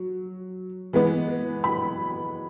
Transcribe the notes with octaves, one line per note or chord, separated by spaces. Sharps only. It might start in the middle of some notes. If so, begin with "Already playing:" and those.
Already playing: F#3
E3 G#3 B3
B5